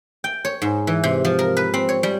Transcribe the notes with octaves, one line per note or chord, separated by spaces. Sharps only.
G5
C#5
G#2
E3
C3
F3
A#4
B4
C4
C#5
G3